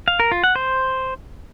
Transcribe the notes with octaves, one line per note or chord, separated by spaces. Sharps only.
F5
A#4
F4
F#5
C5